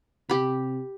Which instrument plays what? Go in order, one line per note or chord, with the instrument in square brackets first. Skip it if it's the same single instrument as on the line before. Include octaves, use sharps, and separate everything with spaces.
[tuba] C3 [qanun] G4 B5